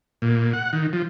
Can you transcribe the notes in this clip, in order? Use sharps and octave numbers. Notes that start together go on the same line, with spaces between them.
A#2
F#5
D#3
F3